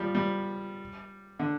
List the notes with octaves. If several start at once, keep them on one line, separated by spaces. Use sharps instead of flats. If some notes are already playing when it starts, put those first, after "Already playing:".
Already playing: F3 G3
G3
D3